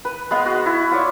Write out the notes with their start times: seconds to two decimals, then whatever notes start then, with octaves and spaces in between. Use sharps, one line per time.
0.05 B4
0.31 G#3 B3 F5
0.46 F#4
0.66 E4
0.91 F4 C#5 D5